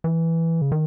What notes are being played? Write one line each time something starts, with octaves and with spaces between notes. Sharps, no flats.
E3
C#3
D#3